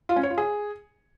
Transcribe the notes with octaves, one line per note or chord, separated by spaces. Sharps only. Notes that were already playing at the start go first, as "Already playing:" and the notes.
F4
C#4
C#5
F4
G#4